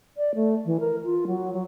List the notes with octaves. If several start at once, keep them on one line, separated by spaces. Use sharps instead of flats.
D5
A3
E3
A#4
F4
F#3
F#3